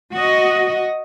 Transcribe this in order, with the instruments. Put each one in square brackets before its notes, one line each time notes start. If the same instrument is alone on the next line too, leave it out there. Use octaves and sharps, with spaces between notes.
[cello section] F#4 D#5